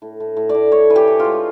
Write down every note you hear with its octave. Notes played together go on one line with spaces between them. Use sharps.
A2
A2
A2
D5
A2
A2 C#5
E3
G4
E3
G#3 F4